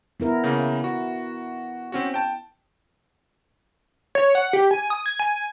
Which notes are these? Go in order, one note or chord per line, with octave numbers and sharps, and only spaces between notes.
B3 E4 A#4
C#3 A#3
F#4
C4 C#4 F#4
G5 A5
C#5
F#5
G4
G#5
D#6
G#6
G#5